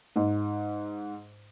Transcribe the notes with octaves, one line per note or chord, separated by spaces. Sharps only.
G#2